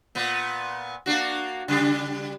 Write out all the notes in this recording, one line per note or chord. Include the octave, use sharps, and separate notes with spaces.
A#2 B3
A#3 D4 F#4
C#3 G3 D4